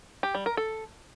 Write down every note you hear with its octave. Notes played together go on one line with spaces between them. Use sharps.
G4
G3
A#4
A4